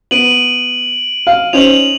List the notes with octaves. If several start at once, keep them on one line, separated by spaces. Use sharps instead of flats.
B3 D7 D#7 F#7
F5
C#4 D#4 C5 F7 F#7